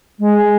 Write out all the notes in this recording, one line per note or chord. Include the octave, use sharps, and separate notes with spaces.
G#3